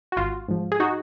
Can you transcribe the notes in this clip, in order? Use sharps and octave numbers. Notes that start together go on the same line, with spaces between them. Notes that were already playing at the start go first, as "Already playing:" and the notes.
F#4
G#1 F4
G#2 F3
G#4
D#4 F#4